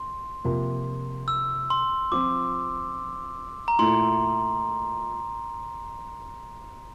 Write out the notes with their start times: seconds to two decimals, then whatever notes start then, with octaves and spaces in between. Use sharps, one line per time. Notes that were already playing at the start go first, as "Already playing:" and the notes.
Already playing: C6
0.44 C3 F3 A#3
1.28 E6
1.70 C6
2.12 F3 C4 F4 D6
3.68 A#5
3.79 A#2 A3 E4 C6